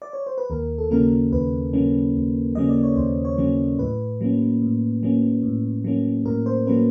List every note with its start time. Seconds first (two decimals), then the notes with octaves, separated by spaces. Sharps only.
0.02 D5
0.13 C#5
0.26 C5
0.38 B4
0.50 D#2 A#4
0.78 A4
0.91 C#3 F#3 A#3 C#4 A#4
1.33 D#2 B4
1.73 C#3 F#3 A#3 C#4
2.15 D#2
2.55 C#3 F#3 A#3 C#4 D#5
2.69 D5
2.83 C#5
2.96 D#2 C5
3.25 C#5
3.38 C#3 F#3 A#3 C#4
3.79 A2 B4
4.21 F#3 A#3 C#4
4.61 A2
5.03 F#3 A#3 C#4
5.43 A2
5.84 F#3 A#3 C#4
6.25 A2 A#4
6.46 C5
6.67 F#3 A#3 C#4 B4